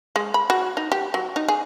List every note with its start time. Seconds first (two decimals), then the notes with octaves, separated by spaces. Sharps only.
0.16 G#3
0.34 B5
0.50 F#4
0.77 D#4
0.92 G4
1.14 F#3
1.36 D#4
1.48 G#4